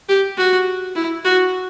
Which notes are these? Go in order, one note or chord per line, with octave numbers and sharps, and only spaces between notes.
G4
F#4
E4
F#4